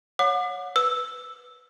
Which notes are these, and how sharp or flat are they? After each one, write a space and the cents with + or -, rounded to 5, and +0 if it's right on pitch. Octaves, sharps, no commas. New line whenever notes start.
C#5 +10 F#5 -35 D6 +35
B4 +0 E6 +0